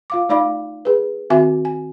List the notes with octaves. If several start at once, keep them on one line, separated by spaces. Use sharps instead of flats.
F4 F5 D6
A3 D#4 D5 F5 B5 D6
G#4 B4
D#3 C4 F#4 E5 G#5
G#5